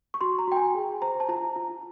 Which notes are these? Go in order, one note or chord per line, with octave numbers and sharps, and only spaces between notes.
C#6
F#4 C6
A#5
F#4 G5
G#5
G#4
C5 A#5
A5
F4 A#5
F4